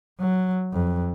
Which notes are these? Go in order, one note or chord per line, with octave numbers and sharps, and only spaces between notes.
F#3
F2